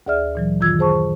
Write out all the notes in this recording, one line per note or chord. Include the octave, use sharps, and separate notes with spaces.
D2 G#4 D5 E5 F6
A#2 E3 F#3
F#2 D#3 F4 E6 G#6
G#4 C5 A5 C#6